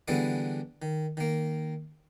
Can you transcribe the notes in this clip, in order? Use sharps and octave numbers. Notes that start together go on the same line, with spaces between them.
D3 E3 G3 G#3 B3 E4
D#3
D#3 A#3